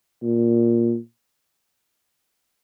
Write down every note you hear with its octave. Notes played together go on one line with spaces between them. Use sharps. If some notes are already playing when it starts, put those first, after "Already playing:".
A#2